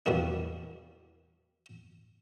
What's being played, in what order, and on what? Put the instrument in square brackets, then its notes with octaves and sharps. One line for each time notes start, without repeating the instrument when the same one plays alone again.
[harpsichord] E2 B2 G3 A#3 D4